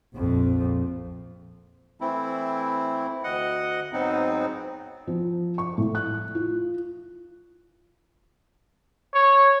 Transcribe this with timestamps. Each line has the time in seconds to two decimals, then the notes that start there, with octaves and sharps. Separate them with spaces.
0.14 A#1 F2
2.01 E3 A3 C4 E4
3.24 D2 D#5 F#5
3.93 G#2 F#3 B3 C4 D#4
5.07 F3
5.58 C#6
5.78 A2
5.95 F#6
6.35 F4
9.14 C#5